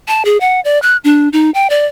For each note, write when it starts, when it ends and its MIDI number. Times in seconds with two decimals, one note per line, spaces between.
0.08 0.25 81
0.25 0.38 68
0.41 0.60 78
0.65 0.81 74
0.82 0.97 90
1.04 1.29 62
1.33 1.50 63
1.54 1.70 79
1.70 1.86 74